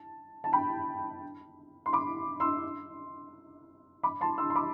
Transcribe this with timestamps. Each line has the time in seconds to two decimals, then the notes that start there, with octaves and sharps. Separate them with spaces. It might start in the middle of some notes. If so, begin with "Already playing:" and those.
Already playing: A5
0.44 A5
0.53 G5 B5
1.86 C6
1.93 B5 D6
2.40 C6 E6
4.03 B5 D6
4.21 A5 C6
4.38 C6 E6
4.50 C6
4.55 B5 D6